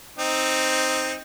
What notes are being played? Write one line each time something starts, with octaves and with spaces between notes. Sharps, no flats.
C4 D#4